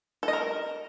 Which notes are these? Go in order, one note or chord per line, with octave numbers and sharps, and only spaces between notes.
A4
D#5
A#4